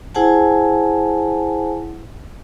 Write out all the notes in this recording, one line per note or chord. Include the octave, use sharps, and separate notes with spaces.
E4 G#4 C5 F#5 G#5 A5